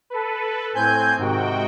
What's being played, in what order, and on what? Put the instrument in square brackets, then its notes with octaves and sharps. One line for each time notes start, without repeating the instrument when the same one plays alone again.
[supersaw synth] A4 B4
[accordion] A2 G#5 G6 [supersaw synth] C4
[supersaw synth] G#2 F#4 G5 [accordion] C3 D#3